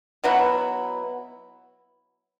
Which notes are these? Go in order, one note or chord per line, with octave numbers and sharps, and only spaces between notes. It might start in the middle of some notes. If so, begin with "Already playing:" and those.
B2 F#3 B3 E4